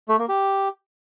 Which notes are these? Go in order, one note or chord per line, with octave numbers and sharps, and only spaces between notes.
A3
A#3
G4